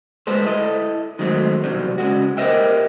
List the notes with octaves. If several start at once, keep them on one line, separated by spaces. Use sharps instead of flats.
G3 G#3 A4 B4 C5
E4 A4 D#5
D#3 F#3 G#3 A3 C4
B1 E2 C3 F#3 G3
C#3 G#3 F#4
G4 A#4 C5 D#5 E5 G5